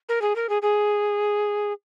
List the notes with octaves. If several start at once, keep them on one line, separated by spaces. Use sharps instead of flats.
A#4
G#4
A#4
G#4
G#4